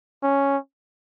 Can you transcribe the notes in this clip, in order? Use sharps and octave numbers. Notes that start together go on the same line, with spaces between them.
C#4